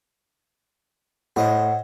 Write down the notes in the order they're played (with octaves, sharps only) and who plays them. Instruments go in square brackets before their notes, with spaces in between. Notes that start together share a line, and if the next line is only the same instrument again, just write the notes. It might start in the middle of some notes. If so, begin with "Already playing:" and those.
[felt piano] A2 [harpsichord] C5 D#5 G#5 [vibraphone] F#5